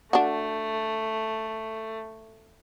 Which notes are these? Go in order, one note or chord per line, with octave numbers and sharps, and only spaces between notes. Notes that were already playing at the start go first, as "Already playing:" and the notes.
A3 D4 F#4